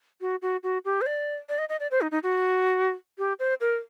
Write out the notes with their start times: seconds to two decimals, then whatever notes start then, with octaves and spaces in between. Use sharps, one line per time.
0.21 F#4
0.42 F#4
0.63 F#4
0.85 G4
1.01 C5
1.06 D5
1.49 D5
1.58 D#5
1.69 D#5
1.80 D5
1.91 C5
2.01 D#4
2.11 D#4
2.23 F#4
3.18 G4
3.39 C5
3.61 A#4